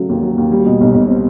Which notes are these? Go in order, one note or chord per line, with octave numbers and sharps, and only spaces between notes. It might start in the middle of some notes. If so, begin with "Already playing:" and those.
Already playing: C#3 F#3 A3
D#2
F#3
D#2
G3
B2
B1
B1
C4